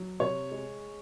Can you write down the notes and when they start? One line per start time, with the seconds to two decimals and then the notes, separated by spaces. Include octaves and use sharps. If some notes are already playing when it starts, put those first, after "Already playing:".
Already playing: F#3
0.20 C3 C#5
0.51 G#3